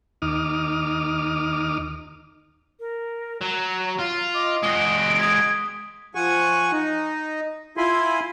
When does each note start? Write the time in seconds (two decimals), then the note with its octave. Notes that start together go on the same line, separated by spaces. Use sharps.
0.22 D#2 D#4 D6 D#6 F6
2.80 A#4
3.41 F#3 A#5
3.99 F4
4.34 D#5 D6
4.63 G#3 F#4 D#6 D7 G7
5.20 D#6 G#6 B6
6.15 F3 F#5 G#5 C#6
6.73 D#4
7.77 E4 F4 G#5 B5 C6